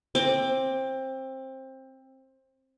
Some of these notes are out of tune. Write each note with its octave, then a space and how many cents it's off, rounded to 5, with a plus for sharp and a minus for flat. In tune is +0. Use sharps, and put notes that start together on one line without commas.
C4 +20 D6 +5